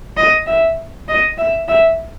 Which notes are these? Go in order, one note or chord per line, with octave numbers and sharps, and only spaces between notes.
D#5
E5
D#5
E5
E5